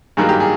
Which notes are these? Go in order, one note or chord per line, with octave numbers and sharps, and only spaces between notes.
G2 D#3 F#3 A#3 G#4
G4
G#4